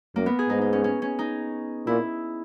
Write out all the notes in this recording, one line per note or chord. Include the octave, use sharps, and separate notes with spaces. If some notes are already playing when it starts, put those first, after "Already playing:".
F#2 A#3
B3
G#4
G#2 D#4
D#4
C#4
C#4
C#4
D#4
A#2 E4